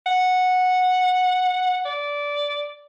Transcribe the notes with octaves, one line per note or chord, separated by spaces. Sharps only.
F#5
D5